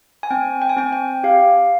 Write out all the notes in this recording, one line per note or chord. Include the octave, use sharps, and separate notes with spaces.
G#5
C4 G5
G5
G#5
C4 G5
G5
G4 F5